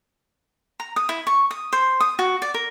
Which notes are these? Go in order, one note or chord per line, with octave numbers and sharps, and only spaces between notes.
A#5
D#6
E4
C#6
D#6
C5
D#6
F#4
D5
A#4